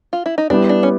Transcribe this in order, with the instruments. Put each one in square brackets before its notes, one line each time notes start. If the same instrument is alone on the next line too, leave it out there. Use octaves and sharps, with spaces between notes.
[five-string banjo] F4
E4
D#4
[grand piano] G3 B3 E4 G4 [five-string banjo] D4
[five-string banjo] D4
C#4